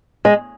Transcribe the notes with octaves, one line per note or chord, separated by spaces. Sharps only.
G#3